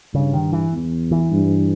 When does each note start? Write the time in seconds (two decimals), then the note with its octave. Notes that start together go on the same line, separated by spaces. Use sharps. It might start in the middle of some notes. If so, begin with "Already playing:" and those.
0.14 G2 C#3
0.34 D#3
0.53 E3
0.73 E2
1.11 E3
1.31 G2